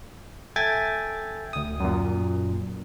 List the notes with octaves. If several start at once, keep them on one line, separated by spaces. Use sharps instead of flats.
A4 E5 G5 G#5 G#6 A6
D2 D#6
F#2 A#2